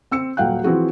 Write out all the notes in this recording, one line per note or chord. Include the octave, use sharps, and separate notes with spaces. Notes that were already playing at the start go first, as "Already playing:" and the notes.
C4 E6 C#7
D#1 F#3 F5 G5 F#6
E3 F3 C4 F#4 G#4